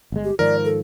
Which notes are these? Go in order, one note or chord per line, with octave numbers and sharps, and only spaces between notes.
G1 G#3
G4
G#2 D#3 F3 A#4 D5
A4